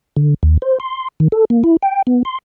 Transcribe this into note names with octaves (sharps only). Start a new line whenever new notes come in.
D3
D#2
C5
C6
D#3
A4
A#3
E4
G5
B3
C6